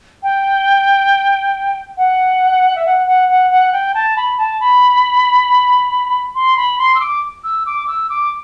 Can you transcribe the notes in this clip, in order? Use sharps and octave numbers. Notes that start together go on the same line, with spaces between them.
G5
F#5
E5
F#5
F#5
F#5
F#5
G5
A5
B5
A5
B5
C6
B5
C6
E6
D6
E6
D6
E6
D6